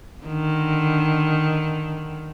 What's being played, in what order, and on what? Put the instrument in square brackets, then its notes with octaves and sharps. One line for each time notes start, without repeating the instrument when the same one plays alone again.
[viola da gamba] D3 D#3